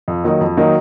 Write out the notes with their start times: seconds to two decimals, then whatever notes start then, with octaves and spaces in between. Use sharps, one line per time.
0.08 F2
0.24 D#3 F#3 A#3 D#4
0.41 F2
0.57 D#3 F#3 A#3 D#4